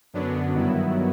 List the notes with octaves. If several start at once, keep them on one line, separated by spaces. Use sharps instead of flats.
F#2 D3 F#3 B3 D4
G2 D#3 F#3 B3 E4